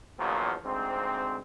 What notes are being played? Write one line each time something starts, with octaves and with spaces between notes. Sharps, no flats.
A#1 E2 A#2 F3 F#3
D2 G#2 C4